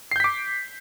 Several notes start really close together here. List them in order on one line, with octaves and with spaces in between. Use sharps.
C7 G6 B6 D6